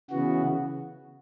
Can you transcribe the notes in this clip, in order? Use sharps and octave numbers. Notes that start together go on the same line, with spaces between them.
C#3 E3 B3 F#4